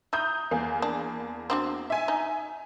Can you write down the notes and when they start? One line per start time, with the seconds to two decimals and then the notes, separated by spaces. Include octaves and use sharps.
0.13 E4 A#5 D#6 G6
0.51 E2 A#3 G#4
0.82 D4
1.50 C4 D4 F#4
1.90 E5 G#5
2.08 D#4